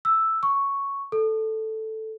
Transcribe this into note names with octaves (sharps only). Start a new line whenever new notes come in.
E6
C#6
A4